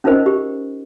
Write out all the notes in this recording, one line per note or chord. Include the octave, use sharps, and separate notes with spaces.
C#4 D#4 F4 A#4 C5 D#5
G4